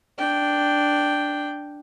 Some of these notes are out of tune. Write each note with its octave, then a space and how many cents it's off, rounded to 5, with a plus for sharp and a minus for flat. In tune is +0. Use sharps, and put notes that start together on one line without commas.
D4 +0 G5 +0